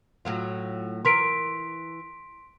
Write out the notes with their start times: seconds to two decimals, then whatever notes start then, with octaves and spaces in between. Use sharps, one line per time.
0.25 A2 F#3 F4
1.05 E3 A#4 C6 B6 D7